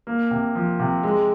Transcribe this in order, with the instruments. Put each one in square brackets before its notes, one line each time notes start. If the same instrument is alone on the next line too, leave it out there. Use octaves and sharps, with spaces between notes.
[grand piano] A#3
C3
F3
C3
G#3